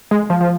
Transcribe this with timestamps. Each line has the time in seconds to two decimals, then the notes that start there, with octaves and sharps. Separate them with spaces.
0.11 G#3
0.30 F3
0.41 F3